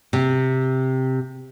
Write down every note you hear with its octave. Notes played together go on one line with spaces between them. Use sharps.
C3